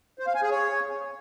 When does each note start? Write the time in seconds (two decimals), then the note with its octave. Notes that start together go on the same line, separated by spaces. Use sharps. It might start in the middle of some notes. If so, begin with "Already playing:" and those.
0.19 C5
0.27 F5
0.35 G#5
0.43 G#4
0.50 C#5